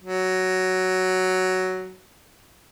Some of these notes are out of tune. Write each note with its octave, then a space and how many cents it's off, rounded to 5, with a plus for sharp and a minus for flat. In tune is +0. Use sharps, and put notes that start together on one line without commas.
F#3 +5